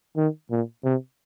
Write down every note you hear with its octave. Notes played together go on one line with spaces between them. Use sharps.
D#3
A#2
C3